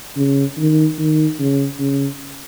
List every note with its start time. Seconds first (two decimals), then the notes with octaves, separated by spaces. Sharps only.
0.16 C#3
0.58 D#3
0.98 D#3
1.39 C#3
1.79 C#3